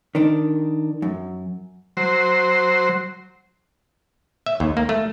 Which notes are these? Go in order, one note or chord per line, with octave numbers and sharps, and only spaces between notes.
D#3 D4
F#2
F#3 C5
E5
D#2
A#3
A3